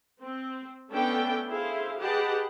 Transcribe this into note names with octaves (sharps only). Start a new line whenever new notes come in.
C4
A3 B3 C#4 D4 A4 G5
E4 G#4 A4 C5 F5
G4 G#4 B4 D#5 F#5 A5